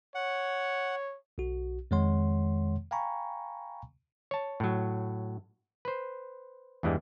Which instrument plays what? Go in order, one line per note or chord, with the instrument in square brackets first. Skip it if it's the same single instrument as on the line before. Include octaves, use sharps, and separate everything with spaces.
[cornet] C#5 [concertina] F#5
[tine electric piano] B1 F#4
F2 D#3 G#3 C#5 F#5 C6
F5 G5 G#5 A#5 B5 C#6
[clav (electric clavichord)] C#5 A5
A2 F#3
B4 C5
E2 G2 E3 G3 G#3